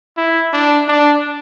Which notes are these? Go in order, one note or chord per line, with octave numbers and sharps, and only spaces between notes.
E4
D4
D4